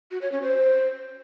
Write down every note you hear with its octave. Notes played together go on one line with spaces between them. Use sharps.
F#4
C#5
C#4
C5